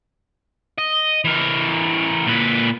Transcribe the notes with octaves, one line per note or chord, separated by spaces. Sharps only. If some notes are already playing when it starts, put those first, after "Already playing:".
D#5
E3 A#4
A#2 B4